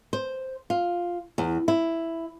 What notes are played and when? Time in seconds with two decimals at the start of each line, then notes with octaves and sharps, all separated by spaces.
0.13 C5
0.70 F4
1.38 E2
1.68 E4